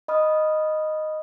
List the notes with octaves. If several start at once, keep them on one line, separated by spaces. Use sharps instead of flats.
D#5 B5 D#6 F6